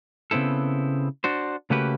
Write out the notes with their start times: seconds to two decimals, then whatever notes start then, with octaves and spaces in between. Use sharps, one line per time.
0.31 C#3 B3 C4 E4 A4
1.24 D4 F#4 C5
1.70 C#3 A3 A#3 F#4 G4 B4